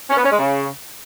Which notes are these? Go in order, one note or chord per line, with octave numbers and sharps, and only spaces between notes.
C#4
B3
C#4
G#3
C#3